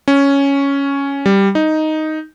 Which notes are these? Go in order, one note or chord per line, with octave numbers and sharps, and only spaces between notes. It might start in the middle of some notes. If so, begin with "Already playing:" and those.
C#4
G3
D#4